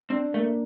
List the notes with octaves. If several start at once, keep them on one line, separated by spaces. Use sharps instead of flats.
C4 D4
A3 A#3